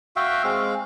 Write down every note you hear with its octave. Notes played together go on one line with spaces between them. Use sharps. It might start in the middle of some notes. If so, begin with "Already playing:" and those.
F#4 E5 F5 G5
G#3 C4 F5